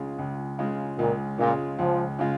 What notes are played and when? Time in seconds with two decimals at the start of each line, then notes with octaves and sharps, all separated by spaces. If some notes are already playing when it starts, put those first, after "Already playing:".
Already playing: C#2 C#3 G#3 F4
0.18 C#2
0.59 C#3 G#3 F4
0.98 C#2 A#2
1.38 A#2 C#3 G#3 F4
1.78 C#2 F3
2.19 C#3 G#3 F4